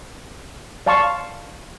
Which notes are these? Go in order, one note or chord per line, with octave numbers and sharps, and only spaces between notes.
D5 F5 A5 C6 C#6